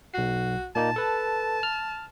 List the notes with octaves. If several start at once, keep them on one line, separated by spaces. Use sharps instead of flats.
B1 F#4 C7
A#2 A#3 D#4 A5
A4 B4
F6